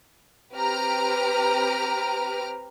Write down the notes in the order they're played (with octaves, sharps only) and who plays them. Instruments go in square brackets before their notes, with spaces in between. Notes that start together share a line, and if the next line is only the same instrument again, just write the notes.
[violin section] C4 G4 B4 A#5 F6 D7